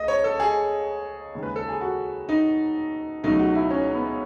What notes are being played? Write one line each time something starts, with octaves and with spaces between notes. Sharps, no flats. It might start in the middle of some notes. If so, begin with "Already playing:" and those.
Already playing: C#2 A3 D#5
C#5
A4
G#4
D#2 C#3 G#3
B4
A4
G#4
F#4
D#4
C#2 B2 F#3 A3 D#4
F#4
E4
C#4
B3